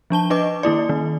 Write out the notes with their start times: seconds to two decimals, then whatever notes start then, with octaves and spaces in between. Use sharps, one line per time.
0.10 F3 D4 A5 G7
0.30 D4 B4 D#5 D6
0.63 D#3 A#3 E4 D5
0.89 D#3